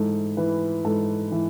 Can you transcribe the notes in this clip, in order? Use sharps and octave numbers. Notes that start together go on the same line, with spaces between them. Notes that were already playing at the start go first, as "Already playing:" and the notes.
Already playing: G#2 E3 A4
E3 B4
G#2 A4
E3